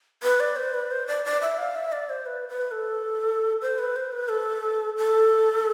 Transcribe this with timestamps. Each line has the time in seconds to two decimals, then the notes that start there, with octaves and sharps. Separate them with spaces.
0.23 B4
0.40 D5
0.56 C5
0.74 B4
0.91 C5
1.08 D5
1.25 D5
1.41 E5
1.58 F5
1.75 E5
1.92 D5
2.09 C5
2.26 B4
2.49 B4
2.72 A4
3.62 C5
3.79 B4
3.96 C5
4.12 B4
4.29 A4
4.97 A4